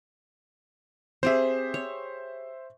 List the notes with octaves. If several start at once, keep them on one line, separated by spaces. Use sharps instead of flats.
C4 G4 G#4 C5 E5
C#5